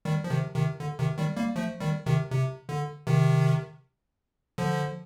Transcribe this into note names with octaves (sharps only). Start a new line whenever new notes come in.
D#3 G3
F3
C3 D#3
C3 D#3
D3
C3 D#3
D#3 G3
G3 A#3
F3 A3
D#3 G3
C3 D#3
C3
D3
C3 D#3
D3 F3